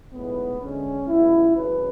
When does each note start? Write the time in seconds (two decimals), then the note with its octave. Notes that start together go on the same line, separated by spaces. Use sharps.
0.14 B1 A2 G#3 B3
0.61 D2 D3 G#3 C#4
1.08 C#2 B2 F#3 E4
1.55 G#1 F#2 C#3 F#3 B4